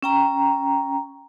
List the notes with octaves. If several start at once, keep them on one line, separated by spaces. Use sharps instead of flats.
C#4 G5 A#5